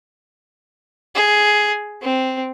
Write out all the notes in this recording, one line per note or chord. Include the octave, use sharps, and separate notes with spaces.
G#4
C4